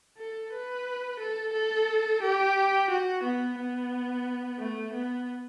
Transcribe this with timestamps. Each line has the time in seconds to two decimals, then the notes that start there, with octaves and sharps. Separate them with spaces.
0.17 A4
0.53 B4
1.19 A4
1.53 A4
2.22 G4
2.90 F#4
3.23 B3
3.58 B3
4.59 A3
4.93 B3